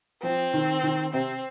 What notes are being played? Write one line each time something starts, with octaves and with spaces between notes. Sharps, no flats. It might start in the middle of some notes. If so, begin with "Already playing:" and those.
F3 C4
D#3
D#3
C3 C4